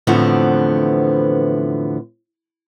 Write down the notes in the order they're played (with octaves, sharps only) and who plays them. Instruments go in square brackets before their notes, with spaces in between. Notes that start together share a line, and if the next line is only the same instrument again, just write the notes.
[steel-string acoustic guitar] E2 A2 D3 F3 B3 C4